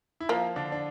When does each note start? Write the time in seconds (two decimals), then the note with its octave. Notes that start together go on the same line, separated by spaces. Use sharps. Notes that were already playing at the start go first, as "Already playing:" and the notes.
0.20 E4
0.29 F3 A#3 F4
0.56 D3 D4
0.72 D4